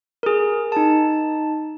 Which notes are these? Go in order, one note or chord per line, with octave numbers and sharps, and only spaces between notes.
G#4 A#4
D#4 A5